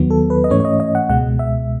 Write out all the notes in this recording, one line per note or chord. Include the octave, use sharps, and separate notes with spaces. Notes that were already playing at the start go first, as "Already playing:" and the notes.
Already playing: D#2 D#3 F#3 B3
A4
B4
D#5
G#2 E3 A3 C#4 C#5
C#5
D#5
D#5
F#5
C#2 B2 G#3 F#5
E5